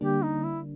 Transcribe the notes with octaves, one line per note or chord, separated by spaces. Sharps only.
D3 G3 A#3 D4 G4
D#4
E4